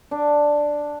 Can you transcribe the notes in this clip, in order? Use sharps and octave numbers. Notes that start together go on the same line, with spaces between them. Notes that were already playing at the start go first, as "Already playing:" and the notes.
D4